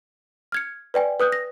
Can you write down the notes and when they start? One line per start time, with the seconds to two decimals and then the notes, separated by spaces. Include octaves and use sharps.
0.52 F6 G#6 C#7
0.94 B4 D5 G5 G#5
1.20 B4 D#6 F#6 G6
1.32 A#6